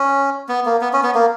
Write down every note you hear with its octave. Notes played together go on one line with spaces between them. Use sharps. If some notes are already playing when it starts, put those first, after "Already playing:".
Already playing: C#4
B3
A#3
B3
C#4
B3
A#3